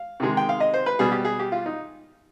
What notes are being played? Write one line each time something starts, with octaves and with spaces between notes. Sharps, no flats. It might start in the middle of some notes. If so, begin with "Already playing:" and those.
Already playing: F5
C3 D#3 G#3
G5
F5
D#5
C5
B4
B2 G3 G#4
G4
G#4
G4
F4
D#4